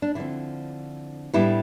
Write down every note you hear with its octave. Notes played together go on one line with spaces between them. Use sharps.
D4
D3 F3 C4 E4
A2 G3 B3 D4 E4